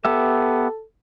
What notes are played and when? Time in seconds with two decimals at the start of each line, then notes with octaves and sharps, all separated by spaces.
0.05 B3 G4 A4 E5